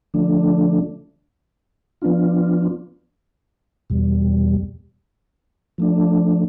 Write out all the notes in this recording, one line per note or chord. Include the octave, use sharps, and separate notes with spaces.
D3 F3 A3 D4
F3 B3 D4 F4
E2 B2 G3
F3 A3 D4